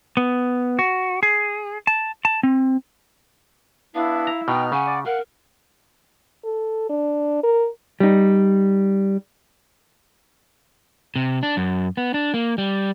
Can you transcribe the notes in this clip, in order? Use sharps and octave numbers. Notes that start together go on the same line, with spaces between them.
B3
F#4
G#4
A5
A5
C4
B3 D4 E4 F5
A#5
B2 B3 D#4 G5 F6
C#3 F#5 G#5
D5
A#4 F5 F#5 F#6
A4
D4
A#4
G3 D#4
C3
D4
F#2
B3
D4
A#3
G3